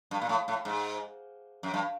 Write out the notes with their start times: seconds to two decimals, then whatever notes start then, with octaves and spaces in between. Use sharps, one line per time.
0.11 G2
0.21 A#2
0.29 A2
0.48 A2
0.65 G#2
1.63 F#2
1.74 G2